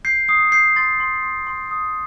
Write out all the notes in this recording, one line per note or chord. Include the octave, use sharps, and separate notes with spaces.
G6 C7
D#6 C7
G6 C7
C6 A6
C6
C6
C6
D#6